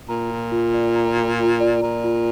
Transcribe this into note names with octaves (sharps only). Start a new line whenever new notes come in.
A#2 A#5
F4
F4
D5
A#5
F4
F4
D5
A#2 A#5
F4